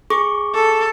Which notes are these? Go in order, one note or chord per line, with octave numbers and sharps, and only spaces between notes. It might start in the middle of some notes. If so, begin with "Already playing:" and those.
G#4 C#6 D6
A4